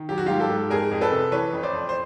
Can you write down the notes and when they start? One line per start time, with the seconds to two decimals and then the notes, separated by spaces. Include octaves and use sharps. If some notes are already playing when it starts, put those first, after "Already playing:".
Already playing: D#3
0.09 F#3 G4
0.18 F#4
0.26 G#2 F4 G4
0.40 G4 A4
0.50 G#2
0.70 F2 G#4 A#4
0.91 F2
1.01 A4 B4
1.12 C3
1.32 E3 B4 C#5
1.53 F2
1.63 C5 D5
1.73 F2
1.89 C5